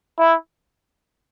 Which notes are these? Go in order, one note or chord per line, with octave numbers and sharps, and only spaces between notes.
E4